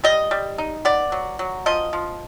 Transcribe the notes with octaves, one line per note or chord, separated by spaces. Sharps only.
G3 D#5
G3
D#4
B3 D5
F#3
F#3
F3 D#5
F3